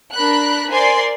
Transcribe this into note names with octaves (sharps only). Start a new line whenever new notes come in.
D4 A#4 B5 F#6
A#4 C5 D5 G#5 C6